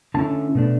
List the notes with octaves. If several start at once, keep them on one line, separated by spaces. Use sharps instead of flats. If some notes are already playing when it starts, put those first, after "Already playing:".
D3 A3 C#4 E4 A5
B2 A3 D4